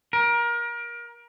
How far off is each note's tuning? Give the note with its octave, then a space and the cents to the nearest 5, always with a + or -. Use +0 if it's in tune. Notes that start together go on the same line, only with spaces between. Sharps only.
A#4 +25